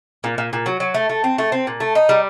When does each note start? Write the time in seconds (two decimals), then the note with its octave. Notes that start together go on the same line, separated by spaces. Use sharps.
0.24 A#2
0.38 A#2
0.53 A#2
0.66 F#3
0.80 F#3
0.94 A3
1.09 A3
1.24 C4
1.38 A3
1.52 C4
1.67 A#2
1.80 A3
1.95 D#4
2.09 G3